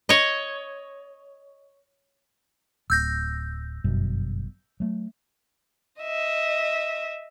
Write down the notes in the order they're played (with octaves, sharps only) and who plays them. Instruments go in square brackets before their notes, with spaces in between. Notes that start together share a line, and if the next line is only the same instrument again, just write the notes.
[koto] C#5 D#5
[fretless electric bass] D1 [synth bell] E6 G6 A#6
[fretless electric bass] G1 F#2 B2
F#3 A3
[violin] D#5 E5